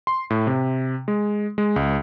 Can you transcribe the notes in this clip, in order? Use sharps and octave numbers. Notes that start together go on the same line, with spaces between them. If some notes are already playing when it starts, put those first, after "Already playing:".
C6
A2
C3
G#3
G#3
C#2